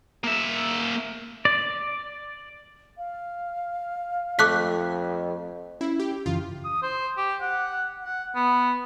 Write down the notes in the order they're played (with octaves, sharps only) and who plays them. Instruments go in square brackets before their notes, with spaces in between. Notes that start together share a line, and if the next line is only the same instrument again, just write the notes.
[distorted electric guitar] A#3 E5
[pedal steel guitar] D5
[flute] F5
[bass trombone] F2 [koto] A3 [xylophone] D6 F#6 B6
[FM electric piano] C#4 [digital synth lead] E4
[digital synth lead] G4
[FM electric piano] F#2 C#3 E3 [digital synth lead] F4
[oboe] D#6
C5
G4
F#5
F#5
B3